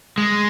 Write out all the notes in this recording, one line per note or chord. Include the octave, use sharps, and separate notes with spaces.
G#3